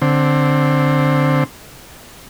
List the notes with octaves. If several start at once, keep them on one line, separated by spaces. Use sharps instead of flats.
D3 C4